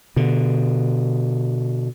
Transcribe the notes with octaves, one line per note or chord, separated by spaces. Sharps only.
B2 D3